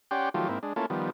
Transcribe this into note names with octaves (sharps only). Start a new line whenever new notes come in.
C#4 G4 D5 F#5 G5 C6
D#3 F3 F#3 A3 F4 G4
G#2 A#3 C4 E4
G#3 D4
A3 A#3 C#4 E4 F4 A4
D#3 F3 G3 B3